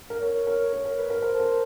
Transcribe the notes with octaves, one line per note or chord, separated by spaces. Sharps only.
A#4
A#4 C#5
A#4
A#4
A#4
B4
A#4
A#4 C5
A4
A#4